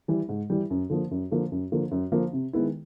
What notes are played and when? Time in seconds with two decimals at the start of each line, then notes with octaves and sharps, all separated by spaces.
0.08 E3 G3
0.29 G#2
0.50 E3 G3
0.70 F#2
0.90 D3 F3 A#3
1.11 F#2
1.31 D3 F3 A#3
1.52 F#2
1.72 D3 F3 A#3
1.91 F#2
2.12 D3 F3 A#3
2.33 C3
2.53 D#3 G#3 B3 E4